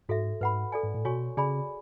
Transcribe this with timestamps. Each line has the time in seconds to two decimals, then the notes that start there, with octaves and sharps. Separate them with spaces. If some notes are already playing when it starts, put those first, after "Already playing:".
0.09 G#2 F#4 A4 E5
0.40 G#2 B4 F#5 B5
0.72 A4 D5 G#5
0.84 G#2
0.94 A2
1.05 B2 F#4 C#5 G#5 C#6
1.37 C#3 G#4 D5 G#5 B5